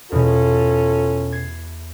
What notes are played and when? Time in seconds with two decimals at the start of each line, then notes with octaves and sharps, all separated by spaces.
0.12 E2 B2 C#4 F4 A4
1.32 G#6 C7